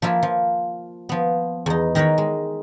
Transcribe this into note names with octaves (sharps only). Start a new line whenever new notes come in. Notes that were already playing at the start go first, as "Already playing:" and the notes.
F3 A#3 E4 F4
F3
F3 B3
E2 D#4
D#3 D#4 A#4 B4 C#5
G#3